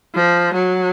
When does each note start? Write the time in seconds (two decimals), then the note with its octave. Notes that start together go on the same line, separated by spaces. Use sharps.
0.14 F3
0.53 F#3